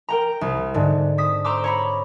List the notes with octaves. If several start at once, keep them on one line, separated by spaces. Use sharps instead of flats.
A#4 G5 A#5
C2
G#2 D3
C4 D#6 B6
C5 A#5 C6 D6 E6
C#5 A#5 B5